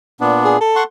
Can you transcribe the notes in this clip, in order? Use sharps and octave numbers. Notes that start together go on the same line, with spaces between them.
A#2 B3 D4
G#4
A4
F#5 C6 C#6